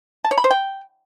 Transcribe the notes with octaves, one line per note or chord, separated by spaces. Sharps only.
A5
C#5
B5
C5
G5